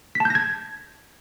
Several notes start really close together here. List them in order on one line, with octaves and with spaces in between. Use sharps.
B6 A5 G6 A#6 G#6